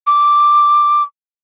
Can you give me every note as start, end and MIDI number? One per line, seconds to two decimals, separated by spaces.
0.06 1.02 86